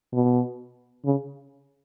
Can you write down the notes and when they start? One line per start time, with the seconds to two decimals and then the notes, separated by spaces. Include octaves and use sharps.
0.13 B2
1.05 C#3